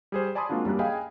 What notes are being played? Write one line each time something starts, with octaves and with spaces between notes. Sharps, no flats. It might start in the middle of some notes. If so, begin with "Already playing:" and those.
G3 G#4 C5
D5 G#5 A5 B5 C6 D#6
G#3 A#3 C4 D4 F4 F#4
F#2 G3 A#3 F#6
G#4 D#5 F5 G5 G#5 B5